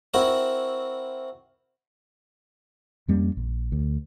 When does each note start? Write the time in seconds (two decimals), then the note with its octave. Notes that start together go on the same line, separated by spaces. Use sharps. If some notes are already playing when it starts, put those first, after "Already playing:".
0.14 C4 E4 F#4 A#4 C5
3.08 F2 G3 A#3 C#4
3.37 A#1
3.72 D2